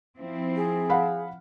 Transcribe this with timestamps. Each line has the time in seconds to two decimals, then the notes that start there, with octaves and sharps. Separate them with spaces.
0.17 F3 C4 E4
0.56 G#4
0.90 F5 F#5 B5